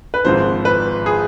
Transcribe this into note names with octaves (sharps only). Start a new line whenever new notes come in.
B4
G#1 G#2 F3 C5
B4
G#4